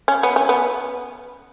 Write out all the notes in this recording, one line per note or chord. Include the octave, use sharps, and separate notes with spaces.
C#4
B3
C#4
B3